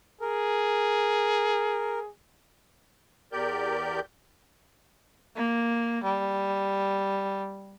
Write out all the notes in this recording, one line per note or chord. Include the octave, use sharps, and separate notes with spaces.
G#4 A#4
E2 G4 A#4 D5 G6
A#3
G3